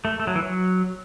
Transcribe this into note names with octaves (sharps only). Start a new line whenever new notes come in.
A3
A3
F#3
E3
F#3